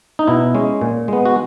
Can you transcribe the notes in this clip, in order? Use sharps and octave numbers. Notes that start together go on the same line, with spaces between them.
D#4
B2 E4
G#3 C#4
A#2
G#3 B3
F#4